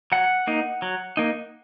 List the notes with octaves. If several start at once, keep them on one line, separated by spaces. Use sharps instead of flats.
F#3 F#5
A#3 D#4
F#3
A#3 D#4